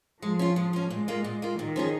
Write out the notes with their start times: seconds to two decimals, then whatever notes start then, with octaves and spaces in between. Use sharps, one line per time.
0.22 F3 G#3
0.39 C#4 F4
0.56 G#3
0.73 C#4 F4
0.90 A#2 G#3
1.08 A#3 F4
1.24 A#2
1.42 A#3 F4
1.59 A#2 D#3
1.76 F3 C#4 G#4